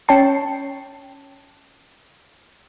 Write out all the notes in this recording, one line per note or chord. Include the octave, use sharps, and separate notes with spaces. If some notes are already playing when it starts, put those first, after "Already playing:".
C#4 C#5 G5 A5 C7